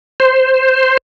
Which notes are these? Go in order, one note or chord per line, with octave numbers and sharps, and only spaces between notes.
C5